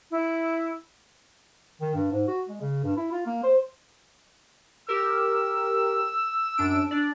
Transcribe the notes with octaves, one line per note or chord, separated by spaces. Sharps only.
E4
D#3
G2
G#2
F#4
G#3
C#3
G2
E4
F4
A#3
C5
G4 A#4 E6
F#2 D4 D7
D4 D5